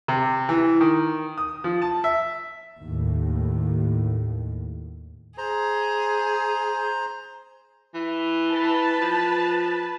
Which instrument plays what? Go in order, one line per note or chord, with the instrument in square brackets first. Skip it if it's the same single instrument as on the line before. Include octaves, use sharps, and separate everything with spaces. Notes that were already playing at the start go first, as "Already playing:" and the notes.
[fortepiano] C3
E3
D#3
D#6
F3
A5
E5
[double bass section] D#2 A2
[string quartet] G#4 [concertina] C5 A#5
[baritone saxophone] E3
[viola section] B4 A5
[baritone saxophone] F3